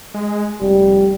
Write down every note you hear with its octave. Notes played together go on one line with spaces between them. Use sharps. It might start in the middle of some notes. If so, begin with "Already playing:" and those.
G#3
F1 G3